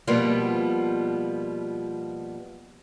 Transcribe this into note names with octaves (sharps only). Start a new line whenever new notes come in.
B2 F3 G3 A#3 B3 F4